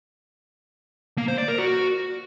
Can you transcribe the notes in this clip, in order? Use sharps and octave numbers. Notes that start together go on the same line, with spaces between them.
A#3
C5
D5
A#4
F#4